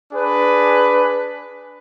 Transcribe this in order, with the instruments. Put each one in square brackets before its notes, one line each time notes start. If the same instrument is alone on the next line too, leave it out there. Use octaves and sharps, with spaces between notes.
[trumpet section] D4 G#4 B4